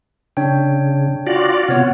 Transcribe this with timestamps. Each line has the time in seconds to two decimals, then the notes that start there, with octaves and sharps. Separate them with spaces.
0.37 C#3 D4 C#5 G5
1.27 F4 F#4 D5
1.68 C3 B3 F4 C#5 F#5